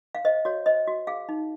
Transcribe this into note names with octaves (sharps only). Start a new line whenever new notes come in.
F5
C5 D#5
F#4 C#5
C5 D#5
F#4
G#4 F5
D#4